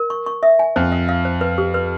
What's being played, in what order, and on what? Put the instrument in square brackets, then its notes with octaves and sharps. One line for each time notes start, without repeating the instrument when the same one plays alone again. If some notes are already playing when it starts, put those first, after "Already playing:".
Already playing: [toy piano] A#4
C#6
C#6
E5
G#5
[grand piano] F2 [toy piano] C5
[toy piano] F5
F5
C5
B4
G4
B4